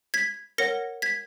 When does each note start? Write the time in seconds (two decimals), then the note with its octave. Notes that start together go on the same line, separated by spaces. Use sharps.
0.14 G#6 B6
0.58 A#4 C#5 F#5 A#6 C#7
1.02 G#6 B6